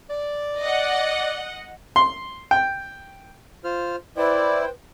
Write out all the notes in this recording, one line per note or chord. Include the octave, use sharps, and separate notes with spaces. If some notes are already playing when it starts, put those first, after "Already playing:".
D5
D#5 F#5
C6
G5
F4 C5 F6
E4 B4 C5 D5 G5